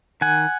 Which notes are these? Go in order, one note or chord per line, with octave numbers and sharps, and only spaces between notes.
D#3 F#5 G#5